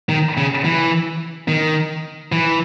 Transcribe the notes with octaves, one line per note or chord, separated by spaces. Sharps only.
D#3
C#3
E3
D#3
E3